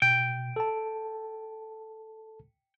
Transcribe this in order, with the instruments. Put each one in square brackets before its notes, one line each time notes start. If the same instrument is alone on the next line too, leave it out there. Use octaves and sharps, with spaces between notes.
[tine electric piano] B2 [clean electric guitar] G5
[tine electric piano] A4 A5